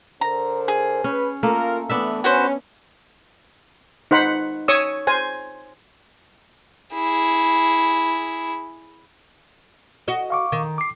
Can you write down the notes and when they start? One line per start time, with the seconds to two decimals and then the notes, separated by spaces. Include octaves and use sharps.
0.21 D3 A#4 C5 A#5
0.68 G#4
1.04 C#4 B4
1.43 A3 A#3 F4 A#4
1.90 E3 A3 B3 D4 E5
2.24 C#4 F#4 B4 C5
4.11 D#4 C5 F#5 B5
4.68 C#5 C#6 D#6 E6
5.07 C5 G#5
6.94 E4 G#4
10.08 F#4 D#5
10.30 F5 C#6 D6
10.52 D#3
10.78 D6 C7